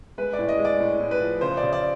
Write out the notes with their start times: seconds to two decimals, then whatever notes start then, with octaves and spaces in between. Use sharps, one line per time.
0.18 G#3 B4
0.33 D5
0.39 A2
0.49 D#5
0.58 G#3
0.65 D5
0.80 A2
1.00 A2
1.11 B4
1.21 F3
1.41 C#3 C5
1.57 D5
1.63 C#3
1.73 D5